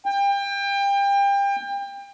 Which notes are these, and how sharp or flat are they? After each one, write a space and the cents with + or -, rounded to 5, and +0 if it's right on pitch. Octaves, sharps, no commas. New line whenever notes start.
G5 +30